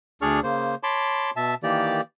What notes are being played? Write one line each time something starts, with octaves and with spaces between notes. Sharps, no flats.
D2 D4 G#4 D5 C#6 F6
C#3 A#3 C5
C#5 A5 B5 C6 D6
B2 E5 A5
D#3 E3 A#3 G4 D5